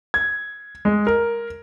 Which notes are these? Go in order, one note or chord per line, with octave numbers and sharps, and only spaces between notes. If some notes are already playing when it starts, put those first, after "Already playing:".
G#6
G#3
A#4